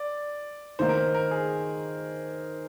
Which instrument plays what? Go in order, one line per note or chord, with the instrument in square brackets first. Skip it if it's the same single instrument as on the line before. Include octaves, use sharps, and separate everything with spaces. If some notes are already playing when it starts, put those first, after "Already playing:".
Already playing: [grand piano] D5
[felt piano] D#3 A#3 D#4 [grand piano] C5
[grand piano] A#4
C5
A#4
G#4